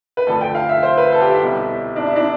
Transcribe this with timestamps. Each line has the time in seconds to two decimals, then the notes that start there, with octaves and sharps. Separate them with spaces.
0.17 B4
0.27 D2 D3 F3 A4
0.41 G5
0.55 F5
0.69 E5
0.83 C5
0.98 B4
1.12 A4
1.21 G4
1.30 E4
1.40 C2 B2
1.96 D4
2.07 E4
2.16 D4